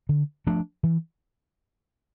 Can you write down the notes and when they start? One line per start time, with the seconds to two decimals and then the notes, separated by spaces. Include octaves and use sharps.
0.09 D3
0.47 F3 A3 D4
0.83 E3